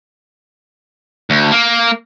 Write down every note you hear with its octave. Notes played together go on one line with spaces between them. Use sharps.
D2
A#3